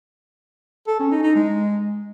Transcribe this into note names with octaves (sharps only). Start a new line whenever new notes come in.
A4
C#4
D#4
D#4
G#3